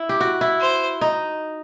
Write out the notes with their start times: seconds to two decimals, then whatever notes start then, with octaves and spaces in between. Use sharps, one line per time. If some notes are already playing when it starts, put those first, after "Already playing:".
Already playing: E4
0.09 G4
0.21 F#4
0.41 E4
0.61 C5
1.01 D#4